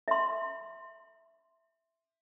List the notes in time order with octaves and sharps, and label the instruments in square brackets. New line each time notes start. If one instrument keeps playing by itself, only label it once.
[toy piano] E5 C6